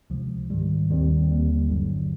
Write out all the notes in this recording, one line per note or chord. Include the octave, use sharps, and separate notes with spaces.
C#2 C3 F3
G#2 D#3 G3
D#2 D#3 G3 C4
D#2 D3 G3 A#3
G1 G2 D3 F#3